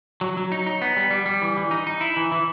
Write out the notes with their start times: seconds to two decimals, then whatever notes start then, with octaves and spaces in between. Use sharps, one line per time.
0.21 F#3
0.37 F#3
0.52 D#4
0.67 D#4
0.82 B3
0.96 G3
1.11 G3
1.26 G3
1.42 E3
1.57 E3
1.71 D#4
1.87 D#4
2.01 E4
2.17 E3
2.32 E3